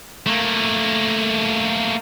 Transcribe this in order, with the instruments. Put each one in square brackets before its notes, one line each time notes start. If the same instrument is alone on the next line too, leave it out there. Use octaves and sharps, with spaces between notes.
[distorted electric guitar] A3 A#3